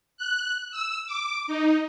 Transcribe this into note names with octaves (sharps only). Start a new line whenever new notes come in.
F#6
E6
D6
D#4